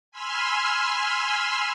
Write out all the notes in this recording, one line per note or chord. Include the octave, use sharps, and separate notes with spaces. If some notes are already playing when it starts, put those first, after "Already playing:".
G#5 B5 C6 E6 F6